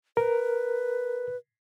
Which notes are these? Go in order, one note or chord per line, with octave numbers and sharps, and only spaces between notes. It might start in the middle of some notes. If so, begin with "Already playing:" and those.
A#4 B4